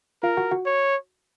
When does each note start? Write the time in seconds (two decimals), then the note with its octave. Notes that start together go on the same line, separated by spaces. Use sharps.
0.23 F4 A#4 F5
0.37 F#4 F#5
0.51 F#4 F#5
0.66 C#5